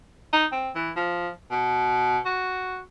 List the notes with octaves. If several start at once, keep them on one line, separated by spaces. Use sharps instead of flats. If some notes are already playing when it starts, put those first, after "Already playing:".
D#4
C4
E3
F3
B2
F#4